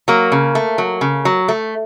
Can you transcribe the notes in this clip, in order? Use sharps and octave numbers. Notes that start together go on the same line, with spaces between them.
F#3 A#3
C#3
A3
F#3
C#3
F#3
A3